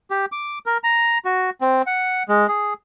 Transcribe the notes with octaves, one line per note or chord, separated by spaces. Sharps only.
G4
D6
A#4
A#5
F#4
C4
F#5
G#3
G#4